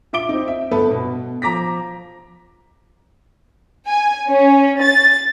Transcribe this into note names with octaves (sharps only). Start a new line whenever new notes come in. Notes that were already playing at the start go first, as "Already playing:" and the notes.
F4 E5 D6 D7 G7
C4 D#4
E5
G1 A3 B3 A4 B4 B5
B2
F3 A#5 D6 A#6 B6
G#5
C#4
A6